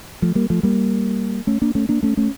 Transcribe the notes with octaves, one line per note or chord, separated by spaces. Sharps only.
F3 A3
G3 A#3
F3 A3
G3 A#3
A3 C#4
A#3 D4
A3 C#4
A#3 D4
A3 C#4
A3 C#4